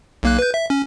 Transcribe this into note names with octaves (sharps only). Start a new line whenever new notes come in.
B1 A#3 F#6
B4 G6
E5
C#4